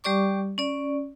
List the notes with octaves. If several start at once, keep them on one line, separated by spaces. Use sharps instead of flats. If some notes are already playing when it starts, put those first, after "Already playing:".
G3 G4 D5 C#6 D6
C#4 D5